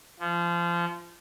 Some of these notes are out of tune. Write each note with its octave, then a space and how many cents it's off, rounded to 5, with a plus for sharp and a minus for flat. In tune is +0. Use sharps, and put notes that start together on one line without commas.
F3 -25